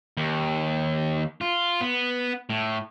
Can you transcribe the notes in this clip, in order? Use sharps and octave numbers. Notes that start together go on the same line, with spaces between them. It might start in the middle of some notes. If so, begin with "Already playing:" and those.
D#2
F4
B3
A2